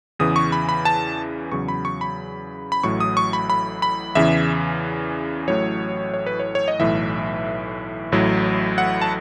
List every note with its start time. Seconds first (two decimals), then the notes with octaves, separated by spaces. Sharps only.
0.19 E2 C#3 E3 D#6
0.36 C#6
0.52 B5
0.69 B5
0.85 A5
1.52 E2 C#3 F#3 C#6
1.68 B5
1.85 C#6
2.01 B5
2.72 B5
2.83 A1 A2 F#3 C#6
3.00 D#6
3.17 C#6
3.33 B5
3.50 B5
3.82 B5
4.15 E2 C#3 E3 E5
5.48 A1 A2 F#3 C#5
6.14 C#5
6.26 B4
6.40 C#5
6.55 C#5
6.68 D#5
6.79 B1 A2 E3 E5
8.12 A1 A2 F#3
8.78 F#5
9.02 A5